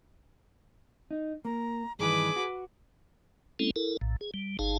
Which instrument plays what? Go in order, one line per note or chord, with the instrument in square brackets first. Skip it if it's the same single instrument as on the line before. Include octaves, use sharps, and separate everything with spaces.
[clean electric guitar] D#4
[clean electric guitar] A#3 [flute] A#5
[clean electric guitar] G2 D#3 E3 [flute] G#4 [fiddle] B4 D6
[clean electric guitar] F#4
[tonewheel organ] G#3 A#3 C4 C#4 E4 A4
E4 A4 A#4
A#1 A2
G#4
G3
G1 D#4 G#4 F5 A5